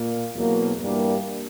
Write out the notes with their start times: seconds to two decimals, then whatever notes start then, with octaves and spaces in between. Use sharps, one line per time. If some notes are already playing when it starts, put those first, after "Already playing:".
Already playing: A#2 A#3
0.35 E2 B2 F#3 A#3
0.80 G2 E3 G3 A#3 D4